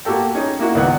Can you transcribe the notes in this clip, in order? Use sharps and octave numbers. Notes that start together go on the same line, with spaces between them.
A#3 F#4 G4 A4 G5
C#4 D#4 G#4
A#3 E4 F#4
C#2 D#3 B3 D5 F#5 F#6